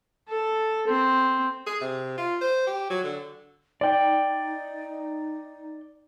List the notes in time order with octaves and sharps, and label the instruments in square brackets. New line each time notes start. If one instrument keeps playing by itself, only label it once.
[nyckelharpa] A4
C4
[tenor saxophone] G#4
C3
F4
C5
G4
F#3
D3
[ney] D#4 [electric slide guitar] D5 G5